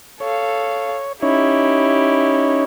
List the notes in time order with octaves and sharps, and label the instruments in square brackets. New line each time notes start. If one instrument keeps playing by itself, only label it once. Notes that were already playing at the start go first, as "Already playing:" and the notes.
[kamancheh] A4 F5 [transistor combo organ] C#5
[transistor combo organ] C#4 D#4 C#5 [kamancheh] E4 G4